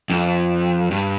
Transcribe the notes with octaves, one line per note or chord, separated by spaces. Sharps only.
F2
G2